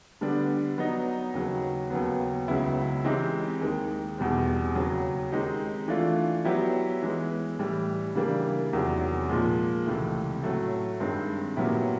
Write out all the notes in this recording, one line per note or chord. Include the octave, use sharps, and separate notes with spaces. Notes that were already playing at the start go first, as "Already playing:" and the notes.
D3 G3 B3 D4
F#3 B3 D#4
D#2 C#3 F#3
D#2 C#3 F#3 B3
C#2 C#3 F#3 B3 E4
E3 G#3 C4 D#4 G4
D#2 D#3 G#3
E2 B2 G3 C4
D#2 C#3 F#3
D#3 G#3 C4 D#4 G4
E3 A3 D4 F4
F#3 B3 E4 G4
E3 G#3 B3
A2 E3 G3
C#3 E3 G3 A#3 D4
E2 C3 D#3 F#3
A#2 F3 G#3
C#2 C3 E3 A3
A2 F#3 A3
G2 D#3 G#3 C4
A#2 F#3 B3 E4 G4